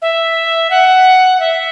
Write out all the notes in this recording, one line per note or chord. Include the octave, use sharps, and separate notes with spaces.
E5
F#5
E5